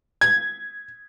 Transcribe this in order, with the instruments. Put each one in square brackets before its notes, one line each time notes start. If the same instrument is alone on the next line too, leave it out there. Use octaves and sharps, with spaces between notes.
[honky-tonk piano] G#6